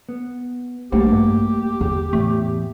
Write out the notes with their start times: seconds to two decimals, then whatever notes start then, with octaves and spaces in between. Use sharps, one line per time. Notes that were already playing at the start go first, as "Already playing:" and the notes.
0.09 B3
0.92 A#1 G3 A3 A#3 F#4 G4
1.12 G2
1.81 E2 D3
2.13 E2 A2 A3